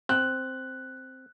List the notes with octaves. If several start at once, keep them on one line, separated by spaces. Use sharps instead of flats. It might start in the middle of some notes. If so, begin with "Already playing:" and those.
C4 F#6